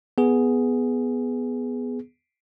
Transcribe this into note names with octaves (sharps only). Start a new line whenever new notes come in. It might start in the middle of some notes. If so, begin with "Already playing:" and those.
B3 G#4